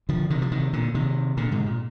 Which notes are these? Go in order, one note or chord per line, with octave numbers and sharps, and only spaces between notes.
D3 F3
C3 D#3
F3
C3 D#3
A#2 D3
C3 D#3
A#2 D3
G#2 C3
A#2